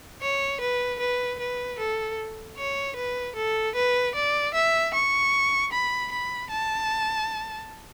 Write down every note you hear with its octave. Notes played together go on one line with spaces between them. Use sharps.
C#5
B4
B4
B4
A4
C#5
B4
A4
B4
D5
E5
C#6
B5
B5
A5